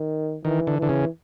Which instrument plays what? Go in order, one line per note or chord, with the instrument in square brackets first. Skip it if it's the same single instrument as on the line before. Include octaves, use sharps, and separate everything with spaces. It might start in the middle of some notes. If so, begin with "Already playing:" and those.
Already playing: [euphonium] D#3
[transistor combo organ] D#3 [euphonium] E3
[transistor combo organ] D3
[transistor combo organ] D3 [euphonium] E3
[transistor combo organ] C#3